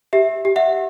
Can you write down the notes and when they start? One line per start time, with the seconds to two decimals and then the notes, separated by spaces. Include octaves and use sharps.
0.13 G4 E5
0.45 G4
0.56 E5 F#5